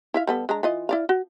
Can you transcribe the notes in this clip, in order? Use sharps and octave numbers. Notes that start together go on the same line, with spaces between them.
E4 E5 F5
G3 B3 A4
G#3 D4 A#5
E3 F4 D#5
E4 D5 F5
F#4